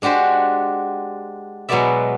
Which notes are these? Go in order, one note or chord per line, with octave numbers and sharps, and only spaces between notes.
G#3 D4 F#4 G4 C5
B2 F#3 G#3 B3 D5 E5